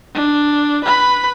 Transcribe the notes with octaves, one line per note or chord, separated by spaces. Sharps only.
D4
B4 B5